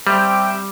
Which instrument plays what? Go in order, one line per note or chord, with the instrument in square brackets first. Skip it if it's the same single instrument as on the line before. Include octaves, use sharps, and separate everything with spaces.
[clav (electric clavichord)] G3 [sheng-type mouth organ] C4 G4 C5 E5 G5